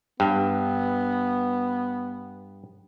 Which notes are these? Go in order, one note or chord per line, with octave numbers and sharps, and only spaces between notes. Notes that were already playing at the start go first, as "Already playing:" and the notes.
G2 B3